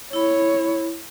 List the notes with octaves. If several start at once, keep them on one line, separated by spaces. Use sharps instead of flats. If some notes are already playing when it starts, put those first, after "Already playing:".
E4 C#5 B5